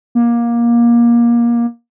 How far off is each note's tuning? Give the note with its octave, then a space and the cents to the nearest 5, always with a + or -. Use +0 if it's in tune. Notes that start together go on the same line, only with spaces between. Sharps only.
A#3 +20